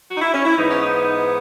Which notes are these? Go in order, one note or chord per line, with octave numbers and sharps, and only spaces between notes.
F#4
D#4
E4
C#4
E4
G#2 E3 B3 D#4
C#4
D#4
D#4